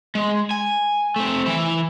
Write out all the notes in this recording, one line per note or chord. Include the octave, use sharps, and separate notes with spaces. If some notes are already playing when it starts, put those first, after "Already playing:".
G#3
G#5
A3 C4
E3 E4